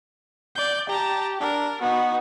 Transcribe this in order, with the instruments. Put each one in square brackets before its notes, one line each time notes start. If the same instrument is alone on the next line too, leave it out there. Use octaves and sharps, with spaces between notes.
[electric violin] D5 G6
[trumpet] G4 [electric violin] A5 A#5
[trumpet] D4 [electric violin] A#4
[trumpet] B3 [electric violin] D#4 F#4